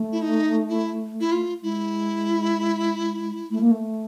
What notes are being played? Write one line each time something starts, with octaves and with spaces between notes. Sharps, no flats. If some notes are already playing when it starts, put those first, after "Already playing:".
Already playing: A3
E4
D#4
E4
E4
F4
G#3 E4
A3
A#3
A3